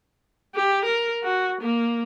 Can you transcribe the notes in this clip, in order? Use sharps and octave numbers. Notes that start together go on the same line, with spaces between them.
G4
A#4
F#4
A#3